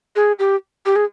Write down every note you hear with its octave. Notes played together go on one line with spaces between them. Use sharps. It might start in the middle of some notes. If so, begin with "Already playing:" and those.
G#4
G4
G4
G#4